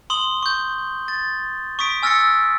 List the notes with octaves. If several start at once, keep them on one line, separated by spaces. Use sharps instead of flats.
C6 D#6 F#7 G7
C#6 G6
A6
C#6 D#6 B6 D7
G#5 E6 F6 A6 A#6 C#7